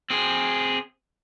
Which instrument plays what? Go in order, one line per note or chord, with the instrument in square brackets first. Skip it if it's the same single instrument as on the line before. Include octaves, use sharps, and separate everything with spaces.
[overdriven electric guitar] C4 G#4